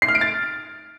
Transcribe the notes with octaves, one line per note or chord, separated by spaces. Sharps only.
C7
F6
D7
A6